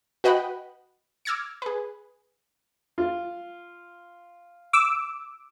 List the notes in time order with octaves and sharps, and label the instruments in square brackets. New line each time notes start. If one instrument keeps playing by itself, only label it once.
[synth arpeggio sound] F#4 B4 D#5 F#5 G5 B5
D6 E6 F6 G#6 A#6 C#7
G#4 B4
[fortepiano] F4
[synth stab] D6 E6